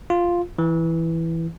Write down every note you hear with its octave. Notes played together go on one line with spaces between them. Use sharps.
F4
E3